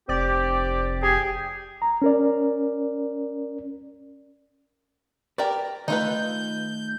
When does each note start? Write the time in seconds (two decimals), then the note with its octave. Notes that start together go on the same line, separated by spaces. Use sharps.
0.09 F1 C4 G4 D5
1.03 G4 G#4
1.82 A#5
2.02 C#4 A#4 D5
5.38 G4 A#4 B4 D5
5.88 D#3 A3 D#4 F4 B4 G6